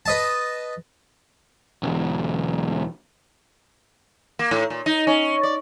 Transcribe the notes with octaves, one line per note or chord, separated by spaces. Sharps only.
B4 D#5 A5
B1 E2
A#3
A2
A#2
D#4
C#4
D5